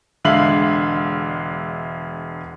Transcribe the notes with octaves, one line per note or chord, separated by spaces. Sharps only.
E1 D3 G#3 E5 F5 F#7